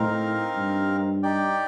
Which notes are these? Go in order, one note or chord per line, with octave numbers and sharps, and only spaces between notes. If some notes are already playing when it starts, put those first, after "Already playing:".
Already playing: A2 C4 D#4 A#4 F5
G2
D#4 G4 D5 G5